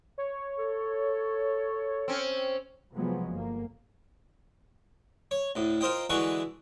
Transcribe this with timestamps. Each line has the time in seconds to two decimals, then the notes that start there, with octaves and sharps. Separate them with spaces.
0.18 C#5
0.57 A4
2.08 C4 C#4
2.94 C3 F3 F#3 G#3 B3
3.29 G1 A#3
5.31 C#5
5.56 D2 A2
5.81 F4 A#4 C5 D#5 G5
6.10 D3 E3 G#3 F#4 B4 C#6